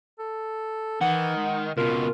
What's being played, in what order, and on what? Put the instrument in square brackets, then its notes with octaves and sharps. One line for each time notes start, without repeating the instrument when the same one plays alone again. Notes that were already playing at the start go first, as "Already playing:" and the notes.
[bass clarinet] A4
[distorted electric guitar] D#3 [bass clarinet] E3 [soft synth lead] F#5
[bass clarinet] G#3
[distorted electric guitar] C#2 B2 [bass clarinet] F4 [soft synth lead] A#4